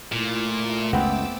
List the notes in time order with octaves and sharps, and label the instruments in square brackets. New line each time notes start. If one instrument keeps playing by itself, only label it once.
[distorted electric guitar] A#2 [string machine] A3 E4 F4
[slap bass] C#2 F#2 [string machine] A3 D6 E6 [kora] B3 C4